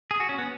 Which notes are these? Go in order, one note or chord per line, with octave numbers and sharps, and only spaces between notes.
G#4
F#4
C#4
B3